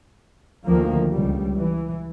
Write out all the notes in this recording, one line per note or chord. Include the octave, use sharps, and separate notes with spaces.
D2 D#3 F3 A#3
C#2 G3
E3